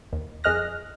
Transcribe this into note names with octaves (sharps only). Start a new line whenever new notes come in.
D#2
F2 G#4 D#5 F6 F#6 A#6